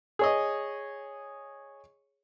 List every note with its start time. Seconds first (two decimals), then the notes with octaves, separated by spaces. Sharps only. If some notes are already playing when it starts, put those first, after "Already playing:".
0.19 G#4 C#5 D#5